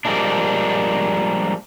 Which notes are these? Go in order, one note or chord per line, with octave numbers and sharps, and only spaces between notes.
F3 G3 G#3 A#3 D4